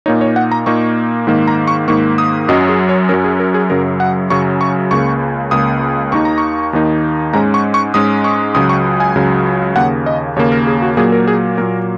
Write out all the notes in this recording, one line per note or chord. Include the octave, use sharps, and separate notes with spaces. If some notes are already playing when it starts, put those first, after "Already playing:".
A#2 A#3 D#4 C#5
C#5
F#5
A#5
A#2 A#3 D#4 C#6
G#2 D#3 A#3
A#5
C#6
G#2 D#3 A#3 C#6
D#6
F#2 F#3 C#4 D#5
G#4
C#5
F#2 F#3 C#4 A#4
G#4
A#4
G#4
F#2 C#3 F#3 A#4
F#5
F#2 C#3 F#3 C#6
C#6
C#2 C#3 A#3 C#6
C#2 C#3 A#3 D#6
D#2 D#3 A#3 D#4 C#6
A#5
C#6
D#2 D#3 A#3 D#4
G#2 G#3 C#4 A#5
C#6
C#6
G#2 G#3 C#4 D#6
C#6
C#2 C#3 F#3 D#6
C#6
G#5
C#2 C#3 F#3
D#2 C#3 A#3 F#5
D#5
D#2 C#3 A#3 C#5
A#4
G#4
F#4
A#2 F#3 A#3 G#4
A#4
G#4
A#2 F#3 A#3 A#4